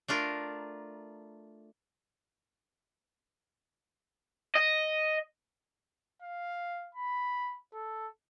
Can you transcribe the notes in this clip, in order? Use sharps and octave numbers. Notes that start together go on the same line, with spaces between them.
A3 D4 F4 A#4
D#5
F5
B5
A4